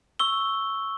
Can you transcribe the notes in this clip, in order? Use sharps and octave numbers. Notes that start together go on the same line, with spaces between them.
C#6 E6 G7